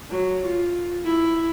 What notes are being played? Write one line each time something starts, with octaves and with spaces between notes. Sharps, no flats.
F#3
F4
E4